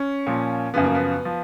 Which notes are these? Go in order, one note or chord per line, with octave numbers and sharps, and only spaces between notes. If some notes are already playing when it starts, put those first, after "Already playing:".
Already playing: C#4
A#2 F3
F#2 C#3 F3 B3
A#3
B3
F3